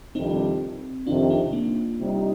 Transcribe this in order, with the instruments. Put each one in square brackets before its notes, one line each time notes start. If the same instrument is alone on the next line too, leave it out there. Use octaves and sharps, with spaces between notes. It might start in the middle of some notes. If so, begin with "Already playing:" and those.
[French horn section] F2 C3 D#3 G3 D4 [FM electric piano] C4 D#4
[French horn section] F2 C3 D#3 [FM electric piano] D4 F4
[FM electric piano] C4 D#4
A#3 D4
[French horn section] C3 G3 C4 D#4